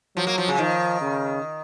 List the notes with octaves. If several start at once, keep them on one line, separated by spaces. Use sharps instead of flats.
F3 F#3
A#3
F3
C#3
D#3 F3
C#3